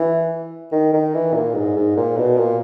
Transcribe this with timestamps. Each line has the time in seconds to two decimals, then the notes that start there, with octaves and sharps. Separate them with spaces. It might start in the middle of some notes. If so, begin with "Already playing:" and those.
Already playing: E3
0.72 D#3
0.93 D#3
1.14 E3
1.34 A#2
1.55 G#2
1.76 G#2
1.97 A#2
2.17 B2
2.38 A#2